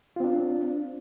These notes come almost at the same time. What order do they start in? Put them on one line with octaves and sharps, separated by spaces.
F4 C4 D4